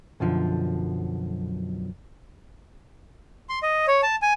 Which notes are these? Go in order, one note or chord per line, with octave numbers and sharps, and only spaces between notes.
B1 F#2 D3 F3
C6
D#5
C#5
A5
G#5